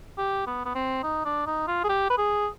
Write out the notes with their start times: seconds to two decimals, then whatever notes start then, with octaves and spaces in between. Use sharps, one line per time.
0.17 G4
0.47 B3
0.65 B3
0.75 C4
1.03 D#4
1.25 D4
1.47 D#4
1.67 F4
1.84 G#4
1.89 G4
2.10 B4
2.18 G#4